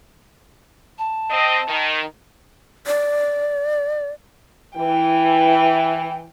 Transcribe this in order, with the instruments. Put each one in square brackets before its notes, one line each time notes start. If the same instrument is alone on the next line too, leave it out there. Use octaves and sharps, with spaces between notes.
[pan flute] A5
[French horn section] C4 D#5
D#3
[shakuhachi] D5
[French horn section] E3 [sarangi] G5